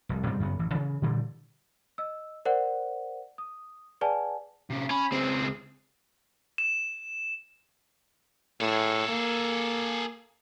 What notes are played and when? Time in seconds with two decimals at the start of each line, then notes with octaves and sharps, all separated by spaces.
0.09 F1 C2
0.26 G#2 C3 G3 C4
0.40 F#2 C#3 A#3 B3
0.59 A1 E3
0.72 C#3 E3
1.02 A#2 D3 E3 G3
1.98 D#5 E6
2.45 A#4 C5 D5 F#5
3.38 D#6
4.01 G#4 B4 D5 F#5 G#5 A5
4.70 C3 C#4
4.90 C#4 B5
5.12 C#2 C4 G#4
6.58 E7
8.61 A2 G#4 A4
9.09 A#3